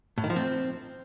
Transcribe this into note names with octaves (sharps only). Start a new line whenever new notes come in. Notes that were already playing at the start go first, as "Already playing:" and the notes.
A2
D#3
F3
C4